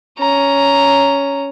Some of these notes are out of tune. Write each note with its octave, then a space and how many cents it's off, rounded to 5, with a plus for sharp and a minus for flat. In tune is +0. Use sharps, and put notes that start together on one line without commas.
C#4 +10 A#5 +0